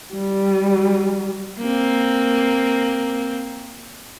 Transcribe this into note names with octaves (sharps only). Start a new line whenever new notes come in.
G3
A#3 C4